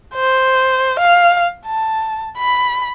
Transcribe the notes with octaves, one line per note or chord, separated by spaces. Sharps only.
C5
F5
A5
B5